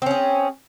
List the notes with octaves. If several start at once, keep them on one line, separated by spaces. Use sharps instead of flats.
C4 C#4 G#4